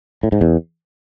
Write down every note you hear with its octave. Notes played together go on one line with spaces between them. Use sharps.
A2
G#2
E2